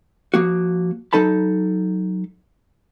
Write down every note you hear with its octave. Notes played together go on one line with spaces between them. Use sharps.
F3 A#3 F#4
F#3 D#4 A4 A5 B5